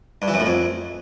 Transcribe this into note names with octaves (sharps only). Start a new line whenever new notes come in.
G2
E3
F#2
A2
F2